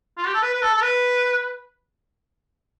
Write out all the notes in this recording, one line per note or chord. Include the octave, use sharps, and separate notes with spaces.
F4
G4
A4
B4
B4
A4
A4
B4